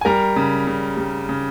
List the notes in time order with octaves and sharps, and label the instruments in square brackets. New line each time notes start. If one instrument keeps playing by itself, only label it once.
[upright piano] G#5
G3 A#4 A#5
C#3
C#3
G3
C#3